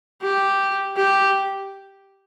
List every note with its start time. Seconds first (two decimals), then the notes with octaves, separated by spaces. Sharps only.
0.22 G4
0.97 G4